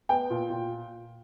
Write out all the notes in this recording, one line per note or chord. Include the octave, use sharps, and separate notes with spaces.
B3 G5
A#2
A#2